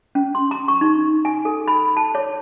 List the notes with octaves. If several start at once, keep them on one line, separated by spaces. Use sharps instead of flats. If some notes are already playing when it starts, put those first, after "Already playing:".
C#4
C6
A#5
C#6
D#4
G#5
A4
B5
A5
C#5